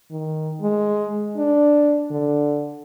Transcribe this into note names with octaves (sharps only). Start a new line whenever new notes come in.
D#3
G#3
D4
D3